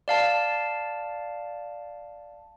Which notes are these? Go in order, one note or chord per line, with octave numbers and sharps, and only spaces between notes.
D5 F5 A5